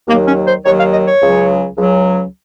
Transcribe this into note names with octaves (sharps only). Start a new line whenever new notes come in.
D#2 D#3 F#3 A#3
C#4
C5
D#2 D#3 F#3 C#5
F5
D#5
C#5
C#2 C#3 F#3
C#2 C#3 F#3